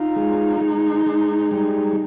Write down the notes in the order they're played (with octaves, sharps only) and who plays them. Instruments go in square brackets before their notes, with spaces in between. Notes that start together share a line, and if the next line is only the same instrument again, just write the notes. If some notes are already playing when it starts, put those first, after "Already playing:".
Already playing: [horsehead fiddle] D#4 [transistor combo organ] F4
[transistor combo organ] G#3
G#3
G#3
G3